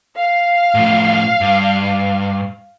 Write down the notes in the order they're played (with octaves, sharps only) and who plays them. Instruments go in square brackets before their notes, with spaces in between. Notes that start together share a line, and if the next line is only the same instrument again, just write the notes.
[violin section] F5
[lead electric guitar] A2 F3
G2